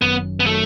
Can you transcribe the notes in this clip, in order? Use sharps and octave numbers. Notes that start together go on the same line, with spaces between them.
G1 F#2 D#3 F#3 B3
B3
D#3 F#3 A3